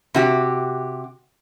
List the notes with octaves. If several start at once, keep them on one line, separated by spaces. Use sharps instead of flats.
C3 F#4 G4